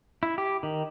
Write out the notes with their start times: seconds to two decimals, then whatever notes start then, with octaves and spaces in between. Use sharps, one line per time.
0.23 E4
0.38 G4
0.63 D#3